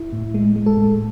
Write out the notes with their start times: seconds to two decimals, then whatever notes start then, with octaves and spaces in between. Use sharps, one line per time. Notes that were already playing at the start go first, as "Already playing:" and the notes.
Already playing: E4
0.13 A2
0.34 G#3
0.56 G#3
0.66 A4
0.77 A2